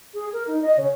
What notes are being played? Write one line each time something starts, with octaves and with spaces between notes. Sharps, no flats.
G#4
A#4
D#4
D#5
C#3